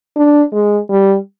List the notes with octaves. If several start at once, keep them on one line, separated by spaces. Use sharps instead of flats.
D4
G#3
G3